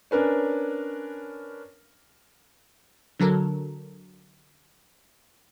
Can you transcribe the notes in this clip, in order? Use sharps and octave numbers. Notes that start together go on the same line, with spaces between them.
C#4 D4 A#4 B4 C#5
D3 F#3 A4 A#4